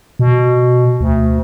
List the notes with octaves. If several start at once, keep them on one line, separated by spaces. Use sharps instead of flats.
B2
D2